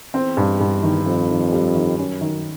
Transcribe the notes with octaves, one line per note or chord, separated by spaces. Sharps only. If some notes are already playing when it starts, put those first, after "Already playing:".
E2 C4
G2
G2
D#3
F2 C4
D#3
G3
D#3
F#2 C#4
D#3